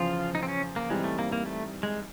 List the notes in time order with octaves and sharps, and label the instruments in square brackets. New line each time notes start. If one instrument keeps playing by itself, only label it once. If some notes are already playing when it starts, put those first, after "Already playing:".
Already playing: [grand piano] E2 C#3 F3 [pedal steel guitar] F4
[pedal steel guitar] D#4
C4
C#4
A#3
[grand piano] G#2 E3 G3 C4 D#4 [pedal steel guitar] G#3
[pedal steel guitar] A3
A#3
A#3
A3
G#3